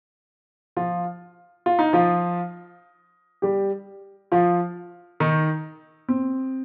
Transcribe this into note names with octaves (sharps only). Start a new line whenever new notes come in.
F3 F4
F4
D#4
F3 F4
G3 G4
F3 F4
D#3 D#4
C4